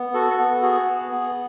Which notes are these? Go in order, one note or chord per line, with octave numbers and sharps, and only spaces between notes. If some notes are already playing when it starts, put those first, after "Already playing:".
Already playing: B3
F#4 A4
A4
B3
F#4 G#4
B3
B3